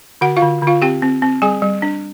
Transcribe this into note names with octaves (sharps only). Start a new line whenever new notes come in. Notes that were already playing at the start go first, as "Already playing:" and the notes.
D3 F#4 F#5
F4 F5
D3
D3
F4 F5
C4 G4 G5
C4
C4
G3 G#4 G#5
G3
D4